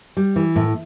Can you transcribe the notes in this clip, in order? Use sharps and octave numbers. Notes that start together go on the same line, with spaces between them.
G3
E3
A2